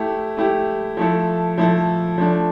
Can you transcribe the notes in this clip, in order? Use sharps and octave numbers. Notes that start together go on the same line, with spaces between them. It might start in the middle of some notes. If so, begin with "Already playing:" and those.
Already playing: A3 E4 G4
A3 E4 G4
F3 A3 E4 A4
F3 A3 E4 A4
F3 A3 D4